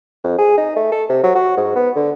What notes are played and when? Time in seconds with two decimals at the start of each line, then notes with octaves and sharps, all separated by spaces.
0.24 F2
0.39 G#4
0.58 D#4
0.76 A3
0.92 A4
1.10 C3
1.24 F#3
1.35 F#4
1.58 G#2
1.76 B3
1.96 D3